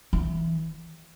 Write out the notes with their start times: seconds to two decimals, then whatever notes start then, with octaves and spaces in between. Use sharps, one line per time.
0.13 E3